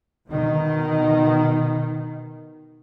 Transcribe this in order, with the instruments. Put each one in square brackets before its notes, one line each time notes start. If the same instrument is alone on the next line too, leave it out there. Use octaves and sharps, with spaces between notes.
[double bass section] B2 D#3